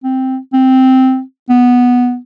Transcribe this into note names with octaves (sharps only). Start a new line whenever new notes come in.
C4
C4
B3